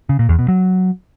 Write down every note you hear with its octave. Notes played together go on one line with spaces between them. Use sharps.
C#3
A#2
E2
B2
F#3